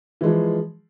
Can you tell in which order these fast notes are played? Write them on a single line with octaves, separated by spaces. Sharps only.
E3 G#3 F3